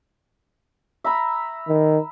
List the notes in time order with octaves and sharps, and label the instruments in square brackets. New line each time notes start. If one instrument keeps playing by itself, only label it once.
[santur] E5 A#5 B5
[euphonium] D#3